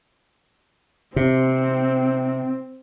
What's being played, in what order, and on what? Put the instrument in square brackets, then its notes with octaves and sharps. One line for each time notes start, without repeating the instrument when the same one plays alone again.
[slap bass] C3 [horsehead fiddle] C4